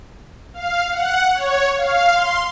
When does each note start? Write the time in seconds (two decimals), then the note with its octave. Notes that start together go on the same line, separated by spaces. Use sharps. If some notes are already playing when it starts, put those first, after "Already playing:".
0.54 F5
0.92 F#5
1.35 C#5
1.76 F5
2.14 C6